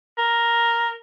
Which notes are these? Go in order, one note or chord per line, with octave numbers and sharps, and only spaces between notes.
A#4